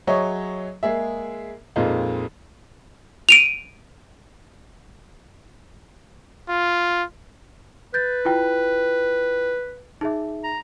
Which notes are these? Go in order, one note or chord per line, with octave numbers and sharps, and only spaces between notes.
F#3 G#4 C#5 D#5 E5
G#3 A#3 G#4 E5
F2 A#2 G#3 C4 D#4 F4
D7 D#7 F7
F4
B4 G6 A6
E4 F4 G5
D#4 G#4 E5
A#5